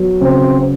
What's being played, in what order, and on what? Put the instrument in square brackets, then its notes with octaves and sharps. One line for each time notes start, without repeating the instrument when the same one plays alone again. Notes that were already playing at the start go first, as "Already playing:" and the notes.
Already playing: [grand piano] F#3 B3
[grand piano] C#3 [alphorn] C4